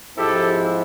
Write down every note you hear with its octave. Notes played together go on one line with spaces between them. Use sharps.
G#2 F3 G#3 C4 E4 G4 A4